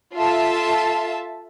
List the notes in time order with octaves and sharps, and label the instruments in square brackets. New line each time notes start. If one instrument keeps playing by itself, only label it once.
[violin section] F4 A4 E5 A5